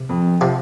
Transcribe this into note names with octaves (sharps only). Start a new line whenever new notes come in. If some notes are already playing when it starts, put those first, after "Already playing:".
Already playing: C3
F2
C3 F3 C4